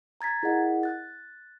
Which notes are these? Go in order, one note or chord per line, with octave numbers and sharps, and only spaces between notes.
A#5 G#6 A6 B6
E4 G#4 A#4 D#5 F#5
F#6 A6